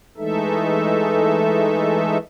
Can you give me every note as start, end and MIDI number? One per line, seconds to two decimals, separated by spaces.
0.18 2.18 52
0.18 2.18 56
0.18 2.18 57
0.18 2.18 63
0.18 2.18 69
0.18 2.18 76